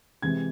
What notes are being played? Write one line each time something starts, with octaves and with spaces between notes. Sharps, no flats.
C3 E3 G#3 G#6